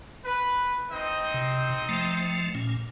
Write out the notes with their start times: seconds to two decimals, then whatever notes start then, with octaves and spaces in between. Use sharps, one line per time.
0.24 B4
0.91 C4 D#4 D#5
1.34 C3
1.89 F3 A3
2.55 A#2 C#4